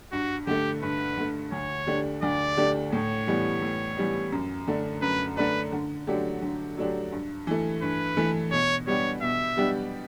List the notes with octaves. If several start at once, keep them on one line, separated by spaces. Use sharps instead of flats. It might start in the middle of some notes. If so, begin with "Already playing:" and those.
G2 F#4
D3 A3 G4
G2 B4
D3 A3
D2 C#5
D3 A3 D4 G4
D2 D5
D3 A3 D4 G4
A2 C#5
E3 G3 B3
A2
E3 G3 B3
F#2
D3 A3 D4
F#2 B4
D3 A3 D4 B4
D3
F#3 A3 D4 G4
D3
F#3 A3 D4 G4
G2
E3 A3
G2 B4
E3 A3
B2 C#5
G3 B3 D4 G4 C#5
B2 E5
G3 B3 D4 G4